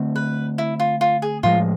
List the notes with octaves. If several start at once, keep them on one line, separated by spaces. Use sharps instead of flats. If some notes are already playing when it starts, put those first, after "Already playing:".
Already playing: D3 A3 C4
B4
E4
F4
F4
G#4
A2 F3 G#3 F4